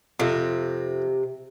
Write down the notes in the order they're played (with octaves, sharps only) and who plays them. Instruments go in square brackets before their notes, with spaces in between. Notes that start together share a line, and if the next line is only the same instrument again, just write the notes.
[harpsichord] F2 [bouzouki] C3